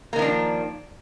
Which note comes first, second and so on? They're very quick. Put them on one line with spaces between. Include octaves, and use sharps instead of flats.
A#3 D#3 F3 D4